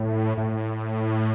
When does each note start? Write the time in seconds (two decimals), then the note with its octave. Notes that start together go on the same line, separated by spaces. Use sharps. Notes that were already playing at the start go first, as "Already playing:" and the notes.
Already playing: A2
0.37 A2